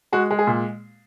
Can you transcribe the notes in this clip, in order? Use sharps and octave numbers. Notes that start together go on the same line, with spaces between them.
G#3 F#4
G#3
G#4
A#2